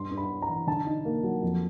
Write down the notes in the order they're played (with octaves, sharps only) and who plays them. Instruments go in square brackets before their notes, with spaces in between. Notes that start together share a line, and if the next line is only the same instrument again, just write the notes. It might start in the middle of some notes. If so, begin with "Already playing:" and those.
Already playing: [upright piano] G2 C6
G2
B5
G3
A#5
E3
D3 A5
D#4
A#3
F#3
F2